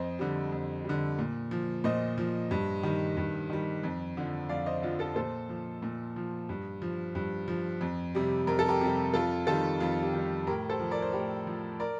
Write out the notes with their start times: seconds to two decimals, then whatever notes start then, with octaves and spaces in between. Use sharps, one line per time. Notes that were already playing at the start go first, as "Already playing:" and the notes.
Already playing: F2 C5 D#5
0.19 D3 G3
0.52 F2
0.84 D3 G3
1.19 A#2
1.51 F3
1.84 A#2 C5 D#5
2.18 F3
2.51 G2
2.83 D#3 G3
3.17 G2
3.50 D#3 G3
3.83 F2
4.17 D3 F3
4.49 F2 D5 F5
4.66 C5 D#5
4.82 D3 F3 F4
4.99 F4 A4
5.16 A#2 A4 C5
5.49 F3
5.82 A#2
6.16 F3
6.49 G2
6.82 F3
7.15 G2
7.48 F3
7.81 F2
8.15 C3 G3
8.47 F2 A#4
8.59 A4
8.68 G4 A#4
8.81 C3 G3
9.14 F2 F4 A4
9.47 D#3 G3 F4 A4
9.80 F2 F4
10.02 G4
10.13 D#3 G3
10.47 A2 G4 A#4
10.69 A4 C5
10.79 F3
10.91 A#4 D5
11.02 C5
11.13 A2 G4 A#4
11.47 F3
11.80 A#4 D5